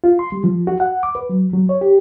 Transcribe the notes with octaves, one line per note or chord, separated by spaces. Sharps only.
F4
C6
G3
F3
F#4
F#5
D6
B4
F#3
F#3
C#5
G4